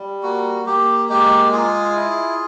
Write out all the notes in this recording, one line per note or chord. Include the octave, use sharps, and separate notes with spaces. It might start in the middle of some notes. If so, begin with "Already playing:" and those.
Already playing: G3
A#3 F#4
A#3 G4
G#3 G4
F4 G#4
E4